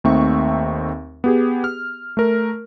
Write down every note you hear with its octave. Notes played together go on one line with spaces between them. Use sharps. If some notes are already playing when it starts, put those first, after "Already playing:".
D#2 A3 C4 D#4 E5 C#6
B3 G4 G#4
F6
A3 A#4